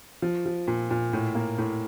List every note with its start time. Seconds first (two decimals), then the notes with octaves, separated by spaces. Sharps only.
0.22 F3
0.46 F3
0.67 A#2
0.90 A#2
1.13 A2
1.35 A#3
1.58 A2